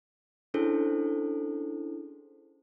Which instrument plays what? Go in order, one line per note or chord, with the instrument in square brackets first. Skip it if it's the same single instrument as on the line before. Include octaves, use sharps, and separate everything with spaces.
[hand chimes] C#4 D4 E4 G#4 A4 C5